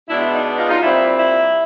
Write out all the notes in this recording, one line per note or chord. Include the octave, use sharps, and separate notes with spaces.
B2 G#3 B3 D4 E4
E4
D#4
D#4 F4
D#4 F4
A#2 G3 C4 E4
E4